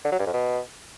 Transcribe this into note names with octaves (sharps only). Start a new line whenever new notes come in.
D3
F#3
G2
F2
B2